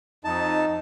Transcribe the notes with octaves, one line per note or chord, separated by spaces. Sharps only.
F2 D#4 A5